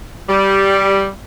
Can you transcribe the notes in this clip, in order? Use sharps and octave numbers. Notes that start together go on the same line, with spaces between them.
G3